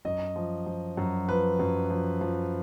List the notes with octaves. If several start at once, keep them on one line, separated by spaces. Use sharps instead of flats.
F#2 D#5
F3
F3
F#2
F3 B4
F#2
F3
F3